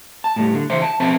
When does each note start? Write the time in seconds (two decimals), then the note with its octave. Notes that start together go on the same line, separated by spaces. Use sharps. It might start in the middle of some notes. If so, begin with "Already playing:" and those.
0.24 A5
0.36 A2 G3
0.54 D3
0.70 C#2 E3 C5 E5 C6
0.82 A5
1.00 F3 C4 B4 E5 A5